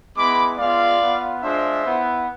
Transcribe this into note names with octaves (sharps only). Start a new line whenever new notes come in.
G#3 B3 E4 B5 D6
G#3 B3 F4 D5 F5
B3 F4
G#3 D4 F4 C5 E5
B3 E4